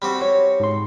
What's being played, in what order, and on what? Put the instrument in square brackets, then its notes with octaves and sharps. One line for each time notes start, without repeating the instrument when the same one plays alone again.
[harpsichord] G3 C4 F#4
[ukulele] C#5
[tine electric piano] G#2 C6